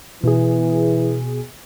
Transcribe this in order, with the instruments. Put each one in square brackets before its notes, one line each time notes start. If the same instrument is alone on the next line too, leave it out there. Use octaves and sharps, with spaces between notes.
[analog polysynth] B2 G#4 [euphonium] E3